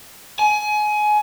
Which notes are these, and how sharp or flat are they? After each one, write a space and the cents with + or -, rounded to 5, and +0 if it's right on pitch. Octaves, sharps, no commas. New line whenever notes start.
G#5 +25